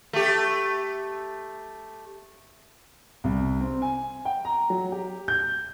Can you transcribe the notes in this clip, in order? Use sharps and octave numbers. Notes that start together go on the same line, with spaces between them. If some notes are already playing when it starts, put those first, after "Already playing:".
A3 G4
C2
C4
G#5
G5
A#5
F#3
G4
G6